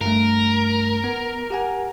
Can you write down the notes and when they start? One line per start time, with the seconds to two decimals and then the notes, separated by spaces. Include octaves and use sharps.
0.01 G2 A3 A#4
1.04 B3
1.50 G4 F#5 G#5